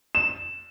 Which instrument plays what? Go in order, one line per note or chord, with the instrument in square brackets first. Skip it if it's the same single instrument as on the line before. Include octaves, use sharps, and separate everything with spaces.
[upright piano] E7